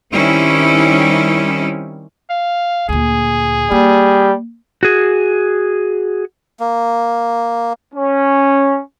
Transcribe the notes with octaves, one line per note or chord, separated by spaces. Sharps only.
D#3 G3 C4 C#4 E4
F5
D2 A#2 G#4
G3 A#3
F#4 G#4
A#3
C#4